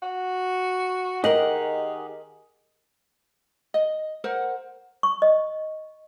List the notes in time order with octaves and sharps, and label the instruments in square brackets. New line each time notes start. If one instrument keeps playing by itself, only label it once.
[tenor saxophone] F#4
[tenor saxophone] D#3 [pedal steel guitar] G4 G#4 F#5 [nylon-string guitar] A#4 D#5
[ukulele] D#5
A#4 C5 F#5
[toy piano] C#6
D#5